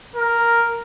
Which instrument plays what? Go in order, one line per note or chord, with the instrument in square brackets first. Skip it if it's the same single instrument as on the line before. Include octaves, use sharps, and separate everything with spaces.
[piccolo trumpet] A#4